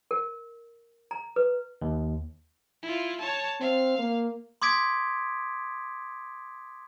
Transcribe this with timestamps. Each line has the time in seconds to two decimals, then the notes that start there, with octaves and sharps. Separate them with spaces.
0.11 A#4
1.11 A#5
1.36 B4
1.82 D#2
2.83 E4 F4
3.20 C#5 A5
3.61 C4 F5
3.99 A#3
4.62 C6 D6 D#6 G#6 B6 D7